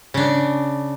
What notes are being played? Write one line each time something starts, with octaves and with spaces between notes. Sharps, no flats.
C#3 D4